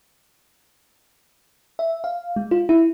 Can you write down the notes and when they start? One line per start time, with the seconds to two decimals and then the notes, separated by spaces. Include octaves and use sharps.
1.79 E5
2.04 F5
2.36 G#3
2.51 F4
2.69 E4